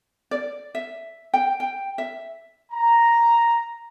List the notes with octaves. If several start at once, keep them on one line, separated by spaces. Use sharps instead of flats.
D5
E5
G5
G5
E5
A#5